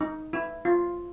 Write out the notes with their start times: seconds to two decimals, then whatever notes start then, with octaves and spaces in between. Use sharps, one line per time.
0.01 D#4
0.33 E4
0.65 F4